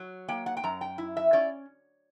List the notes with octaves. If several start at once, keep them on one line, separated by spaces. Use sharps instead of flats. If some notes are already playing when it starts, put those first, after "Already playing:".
Already playing: F#3
A#3 G5
F#5
G5
F#2 A#5
G5
E4
E5
C#4 D5